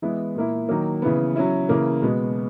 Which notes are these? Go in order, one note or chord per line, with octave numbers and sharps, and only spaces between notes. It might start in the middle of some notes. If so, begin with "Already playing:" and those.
E3 G#3 B3 E4
A#2 A#3 E4
D#3 F#3 A#3
C#3 E3 B3
F#3 C#4 E4
C#3 E3 A#3
B2 G#3 B3